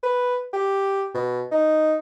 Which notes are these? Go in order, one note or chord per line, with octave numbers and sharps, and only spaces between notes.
B4
G4
B2
D#4